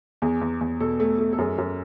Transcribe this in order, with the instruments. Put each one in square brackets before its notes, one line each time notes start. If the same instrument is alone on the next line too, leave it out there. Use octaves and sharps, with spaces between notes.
[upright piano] E2 G#4
E2
E2
B2 A4
A3
A3
A4
F#2 G#4
F#2